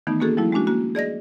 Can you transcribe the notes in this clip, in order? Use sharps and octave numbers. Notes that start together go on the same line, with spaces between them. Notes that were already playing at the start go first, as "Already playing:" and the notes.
D#3 E3 A3 B3 D#4
A#3 C#4 F#4 G#4 A4
F3 G3 A3 E4
G#3 A3 C#4 D4 F#4
A#3 F#4 A#5
G#4 D5 D#5 A#6